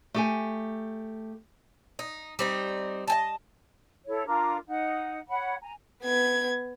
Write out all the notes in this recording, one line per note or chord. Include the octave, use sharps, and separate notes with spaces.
A3 G4 G#5
D#4
G3 C4 D#4
D#5 G#5 A5
E4 A4 C#5
D4 F4 A#4 D6
D#4 F#5
C#5 F#5 B5
G#5 A#5
B3 G#6